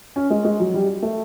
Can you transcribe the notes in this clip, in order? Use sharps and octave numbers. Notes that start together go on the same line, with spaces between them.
C#4
G#3
G#3
F#3
G3
A3